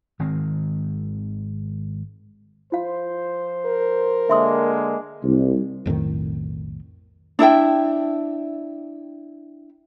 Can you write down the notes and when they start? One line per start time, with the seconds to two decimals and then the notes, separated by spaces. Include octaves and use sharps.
0.19 G#1 D#3 G#3 C4
2.72 F3 F4 C5 F5
3.66 A#4
4.29 D3 G#3 A#3 E5 C6 D#6
5.24 C2
5.86 B1 F2 A2 D#3
7.39 D4 E4 E5 G5